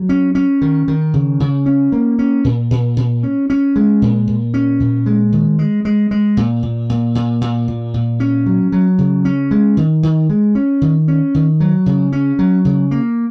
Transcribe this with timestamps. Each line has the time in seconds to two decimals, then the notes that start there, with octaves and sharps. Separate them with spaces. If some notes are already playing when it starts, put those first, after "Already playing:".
Already playing: F#3
0.09 C#4
0.35 C#4
0.61 D#3
0.88 D#3
1.14 C#3
1.40 C#3
1.66 C#4
1.92 A#3
2.19 C#4
2.44 A#2
2.71 A#2
2.97 A#2
3.23 C#4
3.50 C#4
3.76 G#3
4.02 A#2
4.28 A#2
4.54 C#4
4.80 A#2
5.06 G#3
5.32 D#3
5.59 G#3
5.85 G#3
6.11 G#3
6.37 A#2
6.63 A#2
6.90 A#2
7.15 A#2
7.41 A#2
7.68 A#2
7.94 A#2
8.20 C#4
8.46 F#3
8.72 F#3
8.98 C#3
9.25 C#4
9.51 G#3
9.77 D#3
10.03 D#3
10.29 G#3
10.55 C#4
10.82 D#3
11.08 C#4
11.34 D#3
11.60 F#3
11.86 C#3
12.12 C#4
12.39 F#3
12.65 C#3
12.91 A#3